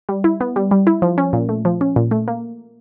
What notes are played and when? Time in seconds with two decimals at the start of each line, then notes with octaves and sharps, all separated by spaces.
0.09 G3
0.24 E4
0.40 B3
0.56 G3
0.71 G3
0.87 E4
1.02 F3
1.18 C#4
1.33 A#2
1.49 A3
1.65 F3
1.81 C#4
1.96 A#2
2.11 A3
2.28 A#3